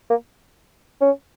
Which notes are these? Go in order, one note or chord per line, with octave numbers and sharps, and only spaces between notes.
A#3
C#4